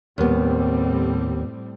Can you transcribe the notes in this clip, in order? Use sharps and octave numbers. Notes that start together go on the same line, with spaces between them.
D#2 A2 G3 B3 C4